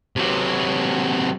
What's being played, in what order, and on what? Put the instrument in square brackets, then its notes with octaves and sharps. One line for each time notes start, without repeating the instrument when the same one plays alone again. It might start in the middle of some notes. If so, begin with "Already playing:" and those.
[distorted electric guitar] C3 F#3